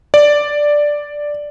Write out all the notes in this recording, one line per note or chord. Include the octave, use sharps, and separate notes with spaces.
D5